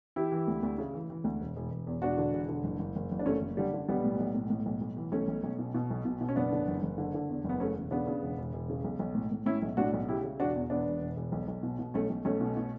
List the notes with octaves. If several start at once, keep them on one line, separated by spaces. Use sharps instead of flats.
E3 E4 G4
E3
D2
D2
C#3
E3
E3
D2
E1
E1
E1
E2
E1 D4 F#4
D3
E1
D3
F#1
F#1
F#1
F#1
D4
F#2 A3 C#4
F#1
D3 G3
D3
B1 G3 B3
A2
B1
A2
A2
B1
B1
E3
B1 A3 C#4
B1
B1
B2
B2
B1
B2
B2
C#4
F#1 B3 D4
D3
F#1
F#1
D3
D3
E2
F#1 B3
C#3 A3 C#4
E1
C#3 B3 D4
C#3
E1
E1
E1
C#3
B1
B1
A2
A2
A2 C#4 E4
B1
A2 D4 F#4
B1
C#3 E4 G4
C#3
E1 D4 F#4
E2
E1 B3 D4
E1
E1
E1
B1
B1
B2
B2
B1 A3 C#4
B1
B1 A3 C#4
B2
B2